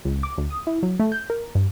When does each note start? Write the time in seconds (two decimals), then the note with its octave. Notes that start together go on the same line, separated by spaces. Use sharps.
0.05 C#2
0.23 D6
0.38 D2
0.50 D#6
0.67 E4
0.83 F#3
1.00 A3
1.12 G6
1.30 A#4
1.55 G2